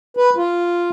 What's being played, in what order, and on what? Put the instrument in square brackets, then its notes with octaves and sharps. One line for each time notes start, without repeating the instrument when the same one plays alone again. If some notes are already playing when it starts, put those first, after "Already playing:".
[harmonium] B4
F4